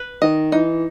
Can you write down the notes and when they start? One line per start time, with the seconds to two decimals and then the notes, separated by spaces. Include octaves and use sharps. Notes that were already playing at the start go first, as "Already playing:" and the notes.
Already playing: B4
0.22 D#3 D#5
0.52 E3 D#4